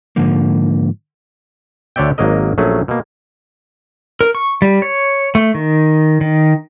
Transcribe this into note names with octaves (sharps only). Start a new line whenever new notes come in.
G#2 D3 F3 A#3
D2 D3 C#5 D5 E5 G5
G#1 F#3 A#3 A#4 D#5
A#1 F#3 A3 C#4 G#4
B2 A#3
A#4
C#6
G3
C#5
A3
D#3
D#3